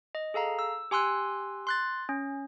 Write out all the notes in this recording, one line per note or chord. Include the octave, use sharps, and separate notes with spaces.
D#5
G#4 A4 F5 A#5
E6
G4 G#5 C6 E6 F#6
C6 F#6 A6
C#4